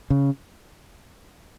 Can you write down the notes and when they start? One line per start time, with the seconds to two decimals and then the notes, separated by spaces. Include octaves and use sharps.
0.10 C#3